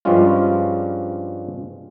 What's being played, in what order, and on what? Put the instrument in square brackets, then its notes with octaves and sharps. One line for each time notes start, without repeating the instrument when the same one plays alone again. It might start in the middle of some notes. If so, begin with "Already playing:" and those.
[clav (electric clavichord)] G2 F3 G3 G#3 C#4 F4